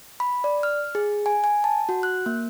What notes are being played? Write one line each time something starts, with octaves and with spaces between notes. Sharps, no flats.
B5
D5
F6
G#4
G#5
G#5
A5
F#4
F#6
A#3